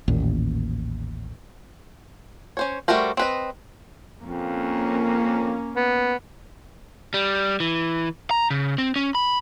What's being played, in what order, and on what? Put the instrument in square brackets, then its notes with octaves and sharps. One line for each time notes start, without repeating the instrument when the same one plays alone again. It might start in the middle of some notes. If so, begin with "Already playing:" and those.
[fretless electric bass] A1 D#2 A#2
[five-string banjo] C#4 C5 C#5
G3 A3 F#4 A#4 C5
C4 B4 D#5
[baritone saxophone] F2 [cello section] A#3 C#4
[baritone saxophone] B3
[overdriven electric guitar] G3
E3
A#5
C#3
C4
C#4
B5